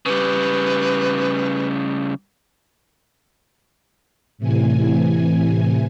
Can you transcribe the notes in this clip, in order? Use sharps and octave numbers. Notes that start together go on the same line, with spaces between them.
C#3 G3 B4
A2 C3 E3 G#5